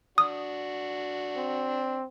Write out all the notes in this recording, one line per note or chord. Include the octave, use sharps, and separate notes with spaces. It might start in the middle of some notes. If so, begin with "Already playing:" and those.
D4 F#4 D#6
C4